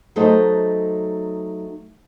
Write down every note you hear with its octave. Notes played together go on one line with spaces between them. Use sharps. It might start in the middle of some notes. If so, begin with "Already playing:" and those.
F#3 A3 D#4 C5 D#5